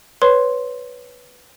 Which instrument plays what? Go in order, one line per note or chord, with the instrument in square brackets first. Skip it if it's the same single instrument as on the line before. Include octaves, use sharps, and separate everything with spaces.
[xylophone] B4 C#5 C6